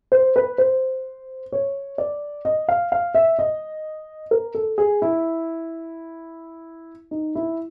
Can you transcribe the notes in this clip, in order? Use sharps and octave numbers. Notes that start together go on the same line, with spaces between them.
C5
B4
C5
C#5
D5
D#5
F5
F5
E5
D#5
A#4
A4
G#4
E4
D#4
E4